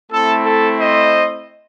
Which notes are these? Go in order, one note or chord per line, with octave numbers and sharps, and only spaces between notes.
A3 C4 E4 A4
A4
C5 D#5